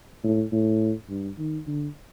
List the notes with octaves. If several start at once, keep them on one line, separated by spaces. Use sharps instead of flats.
A2
A2
G2
D#3
D3